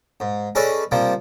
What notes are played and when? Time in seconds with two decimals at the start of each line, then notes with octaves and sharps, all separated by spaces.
0.20 G#2
0.55 C#4 G#4 A4 B4 D5 D#5
0.91 C3 F3 G3 A#3